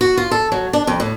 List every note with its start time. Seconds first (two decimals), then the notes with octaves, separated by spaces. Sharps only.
0.01 F#4
0.17 F4
0.31 A4
0.52 F#3
0.73 D4
0.87 F2
1.00 A2